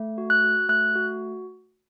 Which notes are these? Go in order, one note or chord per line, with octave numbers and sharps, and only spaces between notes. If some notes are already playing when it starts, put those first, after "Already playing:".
Already playing: A3
F#4
F#6
F#4
A3 F#6
F#4